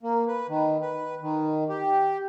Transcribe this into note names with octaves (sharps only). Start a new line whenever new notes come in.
A#3
B4
D#3
B4
D#3
G4